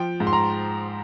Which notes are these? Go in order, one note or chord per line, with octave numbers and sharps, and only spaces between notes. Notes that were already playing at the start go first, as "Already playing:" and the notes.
Already playing: F3 G5
G#2
C6
A#5